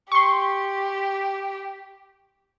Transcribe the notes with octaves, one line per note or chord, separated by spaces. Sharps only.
G4 C6 C#6